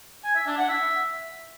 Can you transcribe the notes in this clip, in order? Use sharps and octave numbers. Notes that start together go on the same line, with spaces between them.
G#5
E5
D4
F#5
E5